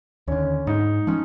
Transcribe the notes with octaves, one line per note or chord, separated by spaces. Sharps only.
D#2 D3 C#4
G#2 D#4
F3 G#3 C#4